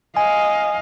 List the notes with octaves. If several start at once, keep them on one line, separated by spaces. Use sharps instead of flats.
D#5 F5 G#5